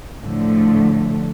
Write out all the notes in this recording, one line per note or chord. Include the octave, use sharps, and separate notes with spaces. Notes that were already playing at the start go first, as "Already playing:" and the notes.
A2 D3 F3 A3